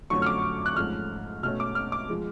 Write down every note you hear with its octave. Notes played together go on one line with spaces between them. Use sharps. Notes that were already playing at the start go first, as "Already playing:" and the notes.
F2 D3 F#3 A3 C#4 C#6
F6
D6
F#6
G#2 F3 A3 C#4 F6
B2 A3 C#4 F6
D6
F6
D6
F3 G#3